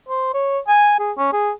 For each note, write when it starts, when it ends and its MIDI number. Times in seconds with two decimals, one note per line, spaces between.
0.09 0.32 72
0.34 0.59 73
0.68 0.95 80
0.99 1.12 68
1.18 1.31 61
1.33 1.51 68